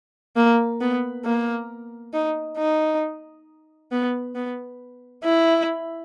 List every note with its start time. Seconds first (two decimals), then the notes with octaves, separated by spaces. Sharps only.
0.36 A#3
0.81 B3
1.24 A#3
2.13 D#4
2.58 D#4
3.92 B3
4.35 B3
5.24 E4